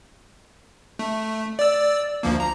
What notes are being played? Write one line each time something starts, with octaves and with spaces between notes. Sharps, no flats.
A3
D5 E6
D2 F3 A#3
A#5